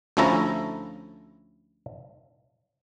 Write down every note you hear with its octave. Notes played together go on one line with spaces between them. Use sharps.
D2 F3 C#4 E4 A4 A#5